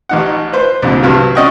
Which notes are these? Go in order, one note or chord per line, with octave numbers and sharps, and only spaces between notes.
A1 D#4 F#5
B4 C5
C2 F2 A#2 D3
G2 C3 F#3
C#4 D5 D#5 F#5 G5 C#6